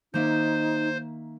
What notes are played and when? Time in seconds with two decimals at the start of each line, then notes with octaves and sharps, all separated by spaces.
0.14 D#3 A#3 D#4 C5 E5